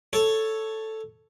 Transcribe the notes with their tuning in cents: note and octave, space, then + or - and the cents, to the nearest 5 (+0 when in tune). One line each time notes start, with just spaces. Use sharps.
A4 +0 C#5 +0